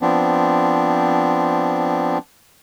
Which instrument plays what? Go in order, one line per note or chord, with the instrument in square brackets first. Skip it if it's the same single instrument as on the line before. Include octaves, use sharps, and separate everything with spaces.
[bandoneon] F3 B3 C4 D4